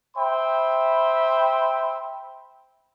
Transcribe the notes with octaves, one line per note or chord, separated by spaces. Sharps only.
C5 E5 G5 B5